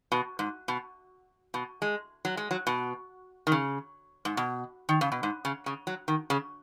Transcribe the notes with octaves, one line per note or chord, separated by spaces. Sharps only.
B2
G#2
B2
B2
G#3
F#3
G#3
F#3
B2
D#3
C#3
G#2
B2
D#3
C#3
B2
G#2
C#3
C#3
F#3
D#3
C#3